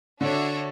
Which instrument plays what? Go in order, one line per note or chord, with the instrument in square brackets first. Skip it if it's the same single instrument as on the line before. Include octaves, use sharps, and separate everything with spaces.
[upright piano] D3 [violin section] D4 F#4 C#5 E5